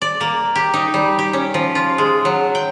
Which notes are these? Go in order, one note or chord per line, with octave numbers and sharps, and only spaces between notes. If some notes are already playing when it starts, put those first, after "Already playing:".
D5
A#3
G4
D#4
G3
G4
C#4
F3
F4
G#3
F#3
G5